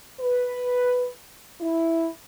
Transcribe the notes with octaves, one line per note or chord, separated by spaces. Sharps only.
B4
E4